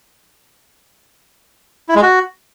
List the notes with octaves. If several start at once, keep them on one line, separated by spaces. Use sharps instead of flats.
E4
G#3
F#4